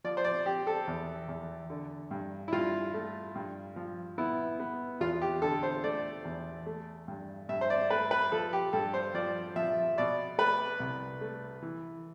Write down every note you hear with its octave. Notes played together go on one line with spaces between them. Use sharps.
F3 D5
C5
D5
C4 G4
A4
E2
E2
D3
G2
E4
G2 F4
A3
G2
F3
B3 E4
B3
E2 F4
G4
D3 A4
C5
A3 D5
E2
A3
G2
G2 E5
C5
D5
A3 B4
B4
F3 A4
G4
G2 A4
C5
F3 D5
F3 E5
B2 D5
A3 B4
C2
A3
E3